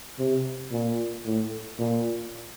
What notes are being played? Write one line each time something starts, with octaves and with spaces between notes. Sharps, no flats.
C3
A#2
A2
A#2